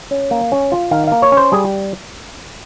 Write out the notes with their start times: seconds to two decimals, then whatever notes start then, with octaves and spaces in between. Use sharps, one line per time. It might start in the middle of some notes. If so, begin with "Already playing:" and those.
0.11 C#4
0.31 A#3
0.52 C#4
0.72 F4
0.91 D#3 F5
1.07 A#3 F5
1.22 C#5
1.32 C#4
1.37 C5
1.52 G3 G#4